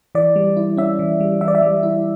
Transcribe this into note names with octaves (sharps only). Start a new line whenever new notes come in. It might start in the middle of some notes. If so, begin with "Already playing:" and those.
E3 D5
G3
E4
C#4 E5
E3
G3
E3 E5
D5
E5
G3
E4